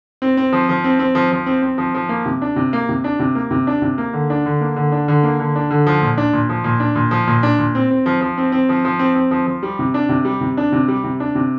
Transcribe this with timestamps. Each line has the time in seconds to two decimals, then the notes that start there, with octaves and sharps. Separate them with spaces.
0.22 C4
0.37 C4
0.53 F3
0.69 F3
0.84 C4
0.99 C4
1.15 F3
1.32 F3
1.46 C4
1.62 C4
1.78 F3
1.95 F3
2.09 A#3
2.25 C3
2.42 D4
2.56 C3
2.73 A#3
2.89 C3
3.04 D4
3.19 C3
3.35 A#3
3.51 C3
3.67 D4
3.82 C3
3.98 A#3
4.13 D3
4.30 D4
4.46 D3
4.61 A#3
4.76 D3
4.92 D4
5.08 D3
5.23 A#3
5.40 D3
5.55 D4
5.71 D3
5.87 F3
6.02 A#2
6.18 D4
6.33 A#2
6.49 F3
6.64 A#2
6.80 D4
6.95 A#2
7.11 F3
7.27 A#2
7.43 D4
7.59 A#2
7.75 C4
7.91 C4
8.06 F3
8.21 F3
8.38 C4
8.52 C4
8.69 F3
8.85 F3
8.99 C4
9.15 C4
9.31 F3
9.46 F3
9.63 G3
9.79 C3
9.94 D4
10.09 C3
10.25 G3
10.41 C3
10.57 D4
10.72 C3
10.88 G3
11.04 C3
11.20 D4
11.35 C3